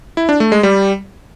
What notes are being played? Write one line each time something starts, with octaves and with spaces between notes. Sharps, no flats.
E4
D4
A3
G#3
G3